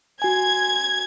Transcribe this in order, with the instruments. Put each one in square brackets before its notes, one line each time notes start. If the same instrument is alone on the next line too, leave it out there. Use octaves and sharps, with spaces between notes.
[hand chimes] F#4 G#5 [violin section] G#6